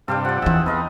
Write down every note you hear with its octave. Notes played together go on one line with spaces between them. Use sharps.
G2 C3 D4 G4 A4 F5
F3 D5 F#5
E2 E3 C4 D#4 G#4 E5
B3 A4 D#5 F5